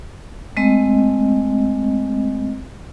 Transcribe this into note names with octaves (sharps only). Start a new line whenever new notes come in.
G#3 A3 C4 D#5